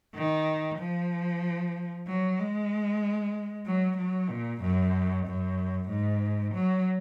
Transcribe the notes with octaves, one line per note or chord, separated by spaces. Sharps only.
D#3
F3
F#3
G#3
F#3
F#3
A#2
F#2
F#2
G#2
F#3